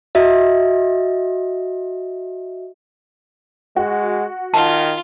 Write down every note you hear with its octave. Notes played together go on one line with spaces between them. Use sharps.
F#4 D#5 E5
G#3 F#4
D#3 F4 A5